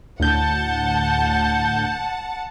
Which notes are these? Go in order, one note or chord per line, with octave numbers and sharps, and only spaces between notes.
D2 A2 F#5 A5 G6